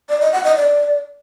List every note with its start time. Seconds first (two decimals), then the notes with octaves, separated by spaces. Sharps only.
0.09 D5
0.21 D#5
0.33 F#5
0.44 D#5
0.56 D5